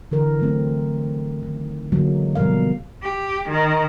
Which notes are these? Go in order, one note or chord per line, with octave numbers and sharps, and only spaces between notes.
D3 E3 A#4
F#3 A3 C4
D#3
D3 E3 F#3 G#3 A#3
B2 F3 G3 A#4 F5
G4
D#3